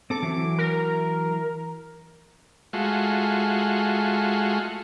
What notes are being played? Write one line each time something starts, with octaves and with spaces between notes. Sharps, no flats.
C4 A4 D6
E3 F#3 E4
A#4
G#3 A3 F4 F#4